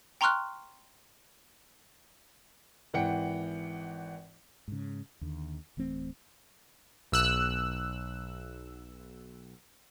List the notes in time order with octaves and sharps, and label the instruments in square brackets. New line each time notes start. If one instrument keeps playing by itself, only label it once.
[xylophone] G5 A#5 C6 C#6 F6 F#6
[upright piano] G#1 E3 F#5 G5 C#7
[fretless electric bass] G#2 C#3
D#2 D3
D1 E3 A3 C4
[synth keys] B1 E6 F#6